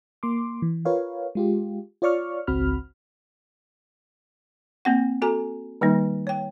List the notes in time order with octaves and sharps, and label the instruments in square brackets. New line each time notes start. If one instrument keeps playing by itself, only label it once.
[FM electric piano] A#3 C6 D6
E3
F4 A#4 B4 C#5 F5
G#3 F4 G4
F4 C#5 D5 C#6 F6
G#1 C#2 C4 F#4 B5 F6
[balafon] A#3 C4 F#5
F#4 A4 G#5 A#5
D#3 G3 A#3 D#4
C#5 G5